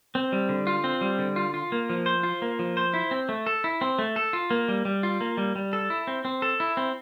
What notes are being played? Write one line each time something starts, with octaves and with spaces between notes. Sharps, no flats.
C4
G3
D3
F4
C4
G3
D3
F4
F4
A#3
F3
C5
F4
A#3
F3
C5
E4
C4
A3
A4
E4
C4
A3
A4
F4
A#3
G3
G3
F4
A#3
G3
G3
A4
E4
C4
C4
A4
E4
C4